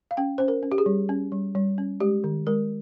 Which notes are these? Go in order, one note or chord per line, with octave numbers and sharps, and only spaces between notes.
F5
C#4 G5
C#4 C5
A#4
C#4
G4
G#4
G3
C#4
G3
G3
C#4
G#3 G4
D#3
G#3 A#4